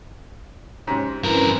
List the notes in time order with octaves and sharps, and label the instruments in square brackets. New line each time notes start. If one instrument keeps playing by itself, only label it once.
[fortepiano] G#2 C3 [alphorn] C#4
[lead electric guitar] G2 A#4 [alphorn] E3 [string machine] C4 C#4 B4